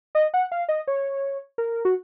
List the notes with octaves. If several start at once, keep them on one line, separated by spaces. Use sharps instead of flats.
D#5
F#5
F5
D#5
C#5
A#4
F#4